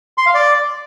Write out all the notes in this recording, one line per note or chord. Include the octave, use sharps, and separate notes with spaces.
C6
F5
D5